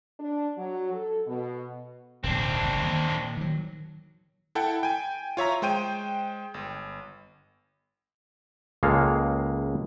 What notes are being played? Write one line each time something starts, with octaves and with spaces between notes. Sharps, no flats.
D4
F#3
A4
B2
D1 B1 C4 D4
F#1
D#2
A#2
D#3 F#3
E4 A4 F#5 G5
G5 G#5
F4 C#5 E5 A#5
G#3 C5 G5 D#7
G1
C#2 C#3 G#3 A#3 A4 F5